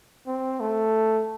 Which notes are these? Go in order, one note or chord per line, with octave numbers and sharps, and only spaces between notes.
C4
A3